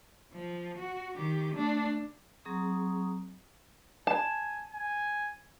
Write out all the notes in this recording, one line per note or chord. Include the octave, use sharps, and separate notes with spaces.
F3
F#4
D#3 G4
A3 D4
F#3 C4 G#4 A#5 C#6 D#6
G#5 A5
G#5